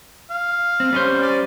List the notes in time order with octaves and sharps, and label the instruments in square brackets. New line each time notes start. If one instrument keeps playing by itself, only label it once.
[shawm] F5
[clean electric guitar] C4
G3 C#4 C5
[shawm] D5